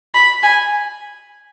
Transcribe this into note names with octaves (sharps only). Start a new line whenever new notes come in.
B5
G#5